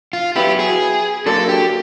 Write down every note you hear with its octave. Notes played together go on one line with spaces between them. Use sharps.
F4
F#3 B3 E4 G4
G#4
D3 F#3 A#3 D4 A4
G4